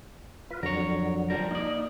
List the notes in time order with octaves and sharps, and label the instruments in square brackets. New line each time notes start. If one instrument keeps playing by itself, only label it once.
[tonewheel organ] F4 B4
[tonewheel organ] F2 D3 F#3 [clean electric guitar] A#4 C#5
[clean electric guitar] F3 G3 A#4
[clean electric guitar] A#3 D5 [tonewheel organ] D#4